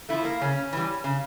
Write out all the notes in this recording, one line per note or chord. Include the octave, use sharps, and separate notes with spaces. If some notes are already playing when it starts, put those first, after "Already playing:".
F3 A3 E4
A#3
C#3 C#4
E3 G3
C#3